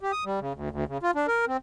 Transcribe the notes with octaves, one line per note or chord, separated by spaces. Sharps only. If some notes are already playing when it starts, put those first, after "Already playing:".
G4
D#6
G3
C#3
D2
D2
C#3
F4
D4
A#4
C4